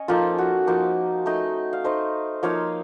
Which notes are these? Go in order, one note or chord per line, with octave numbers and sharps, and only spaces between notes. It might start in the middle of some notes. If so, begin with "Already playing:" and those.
Already playing: C#4 C#5 D#5
F3 A#3 D#4 F4 A4
F#4
F3 A#3 D#4
A3 D#4
F5
A3 D#4 C5 D#5
F3 A#3 D#4 C#5 F5